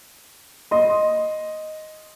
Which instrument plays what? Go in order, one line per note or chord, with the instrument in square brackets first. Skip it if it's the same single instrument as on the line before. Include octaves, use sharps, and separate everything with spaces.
[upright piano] D#5 C6